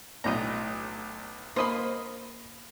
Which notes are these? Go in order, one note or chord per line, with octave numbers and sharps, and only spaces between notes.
B1 A2 D4 D#5 A#5
A#3 C5 D#5 B5 C6